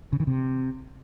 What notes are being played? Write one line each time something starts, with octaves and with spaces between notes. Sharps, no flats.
C#3
D#3
C3